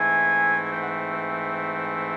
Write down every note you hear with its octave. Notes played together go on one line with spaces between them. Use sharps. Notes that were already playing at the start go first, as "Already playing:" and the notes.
Already playing: G#2 E3 A3 C4 G#5
G#5
G5
F#5
G5